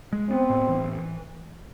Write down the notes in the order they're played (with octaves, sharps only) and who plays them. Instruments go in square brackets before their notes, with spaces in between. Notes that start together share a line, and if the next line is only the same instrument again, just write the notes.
[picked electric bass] G#3
[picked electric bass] B3 [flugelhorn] C4
[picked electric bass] A2
E3